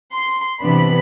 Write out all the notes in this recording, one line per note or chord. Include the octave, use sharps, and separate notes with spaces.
C6
C3 E3 B3 D4 B5